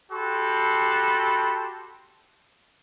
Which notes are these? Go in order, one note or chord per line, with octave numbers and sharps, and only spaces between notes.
F#4 G4 A4 B5 C6